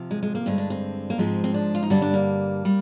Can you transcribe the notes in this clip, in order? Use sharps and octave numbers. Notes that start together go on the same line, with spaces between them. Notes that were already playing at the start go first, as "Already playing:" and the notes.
Already playing: C3 F3
G#3
G#3
A#3
G2 D3 G#3 C4
D4
C4
A#3
G#2 F3 G#3 C4
C4
D4
F4
D#4
G2 D3 G3 D4
D4
A#3
G3